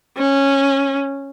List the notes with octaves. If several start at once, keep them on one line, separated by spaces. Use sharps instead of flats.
C#4